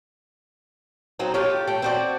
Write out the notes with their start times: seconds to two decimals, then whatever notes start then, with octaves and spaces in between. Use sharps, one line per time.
1.19 F#3 C4 D#4
1.34 F4 G4 A4 C#5
1.67 A3 G5
1.82 C4 F#4 D5